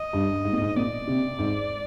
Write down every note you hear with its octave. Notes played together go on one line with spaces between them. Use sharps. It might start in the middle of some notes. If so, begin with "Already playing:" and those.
Already playing: D#5
G2
G#2
A#2
G#2
A#2 D5
C3
G#2